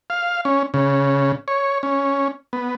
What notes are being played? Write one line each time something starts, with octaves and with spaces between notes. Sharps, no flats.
F5
C#4
C#3
C#5
C#4
B3